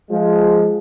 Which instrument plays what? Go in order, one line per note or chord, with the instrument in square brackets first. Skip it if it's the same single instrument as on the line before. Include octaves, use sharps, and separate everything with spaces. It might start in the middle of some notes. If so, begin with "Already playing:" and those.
[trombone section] F3 G#3